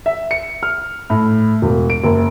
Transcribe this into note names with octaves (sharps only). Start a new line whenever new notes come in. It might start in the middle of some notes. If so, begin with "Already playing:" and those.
E5
C#7
F6
A2
E1
D7
F#1